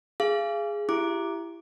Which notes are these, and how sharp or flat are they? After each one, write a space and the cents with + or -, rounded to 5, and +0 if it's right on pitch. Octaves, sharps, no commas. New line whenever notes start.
G#4 +0 F5 -30
E4 +30 G4 +0 D6 +0